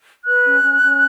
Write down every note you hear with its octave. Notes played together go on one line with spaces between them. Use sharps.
B4 F#6
C#4
C#4
C#4